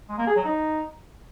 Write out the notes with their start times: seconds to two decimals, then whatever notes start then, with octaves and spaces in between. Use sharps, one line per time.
0.09 G#3
0.18 A#3
0.27 G#4
0.36 F#3
0.45 D#4